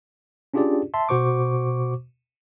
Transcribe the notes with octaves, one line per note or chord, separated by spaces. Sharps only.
C#4 D4 F4 G4 G#4 D5
E5 A5 C6
B2 F#4 C5 C#6 D6